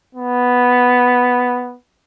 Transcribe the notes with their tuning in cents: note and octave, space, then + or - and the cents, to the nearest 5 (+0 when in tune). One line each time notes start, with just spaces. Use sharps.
B3 +0